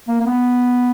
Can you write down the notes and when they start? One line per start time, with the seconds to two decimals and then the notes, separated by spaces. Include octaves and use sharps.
0.08 A#3
0.21 A#3
0.26 B3